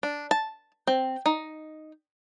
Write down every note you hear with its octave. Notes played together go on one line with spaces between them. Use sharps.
D4
A5
C4
D#4